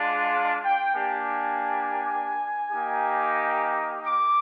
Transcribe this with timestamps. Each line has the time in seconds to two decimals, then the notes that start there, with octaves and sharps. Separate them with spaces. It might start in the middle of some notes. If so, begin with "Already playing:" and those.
Already playing: G#3 D4 F4
0.34 F5
0.64 G5
0.94 A#3 D4 G4 G#5
2.72 A#3 D#4 G4
4.06 D6